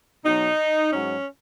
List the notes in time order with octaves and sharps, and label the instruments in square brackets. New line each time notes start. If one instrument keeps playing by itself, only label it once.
[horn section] B2 F#3 D#4
G#2 F#3 C#4